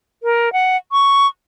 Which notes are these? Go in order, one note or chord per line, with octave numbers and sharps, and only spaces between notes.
A#4
F#5
C#6